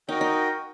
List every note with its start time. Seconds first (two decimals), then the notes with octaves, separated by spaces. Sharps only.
0.09 D#4 F#4 A#4 D#5 G5
0.21 D#4